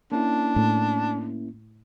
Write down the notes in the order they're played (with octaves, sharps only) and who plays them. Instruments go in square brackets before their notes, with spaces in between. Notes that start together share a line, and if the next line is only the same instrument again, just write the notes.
[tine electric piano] A#3 C#4 E4 [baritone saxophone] D4
[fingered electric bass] A2